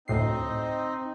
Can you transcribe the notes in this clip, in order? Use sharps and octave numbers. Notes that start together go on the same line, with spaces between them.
D2 A2 C4 D#4 C7